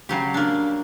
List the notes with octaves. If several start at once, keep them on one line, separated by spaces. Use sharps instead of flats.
C#3 F#3 G4
A#3 D4